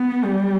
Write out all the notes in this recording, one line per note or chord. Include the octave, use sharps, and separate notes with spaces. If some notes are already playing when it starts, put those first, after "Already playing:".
Already playing: B3
G3